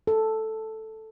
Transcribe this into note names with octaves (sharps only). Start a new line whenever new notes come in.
A4